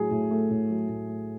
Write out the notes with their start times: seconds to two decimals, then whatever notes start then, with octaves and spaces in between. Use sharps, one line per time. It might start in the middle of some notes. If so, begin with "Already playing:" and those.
Already playing: A2 F#3 G#4
0.11 A2
0.31 A3
0.51 A2
0.70 F#3
0.89 A2
1.09 A3